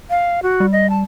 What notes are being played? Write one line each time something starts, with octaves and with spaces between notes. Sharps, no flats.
F5
F#4
G3
D#5
A5